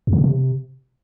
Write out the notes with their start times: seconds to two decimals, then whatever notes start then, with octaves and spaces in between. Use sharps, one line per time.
0.07 E2
0.13 C#3
0.18 A#2
0.24 C3